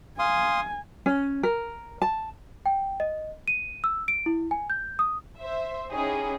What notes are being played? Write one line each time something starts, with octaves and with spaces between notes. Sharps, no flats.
F5 G#5 C6 D#6
C#4
A#4
A5
G5
D#5
D#7
E6
D7
E4
G#5
G6
D#6
C5 E5
C#4 D#4 E4 G4 G#4